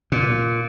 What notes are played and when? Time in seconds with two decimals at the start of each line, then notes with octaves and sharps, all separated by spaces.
0.12 A#2